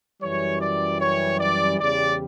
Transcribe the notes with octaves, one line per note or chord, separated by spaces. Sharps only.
F#2 E3 G3 C#5
D5
C#5
D5
E2 C#3 G3 D5